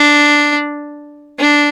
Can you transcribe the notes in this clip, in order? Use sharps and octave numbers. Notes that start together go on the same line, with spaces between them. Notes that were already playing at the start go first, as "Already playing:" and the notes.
Already playing: D4
D4